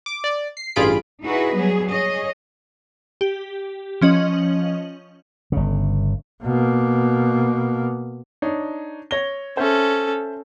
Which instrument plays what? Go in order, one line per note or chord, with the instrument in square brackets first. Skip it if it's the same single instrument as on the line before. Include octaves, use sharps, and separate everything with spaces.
[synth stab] D6
D5
C7
A1 G2 F4 G#4 B5 D7
[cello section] D#4 E4 F#4 G#4 B4 D#5
F#3 G3 B3 G#4
G#4 C#5 D#5
[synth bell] G4
F3 C#4 D#5 F#7
[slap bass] G1 C#3
[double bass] B2 A#3
[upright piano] D4 D#4 C#5
C#5 A#6 G7
[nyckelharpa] C#4 A4 [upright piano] C5 E5